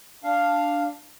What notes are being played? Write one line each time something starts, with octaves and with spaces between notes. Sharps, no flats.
D4 F5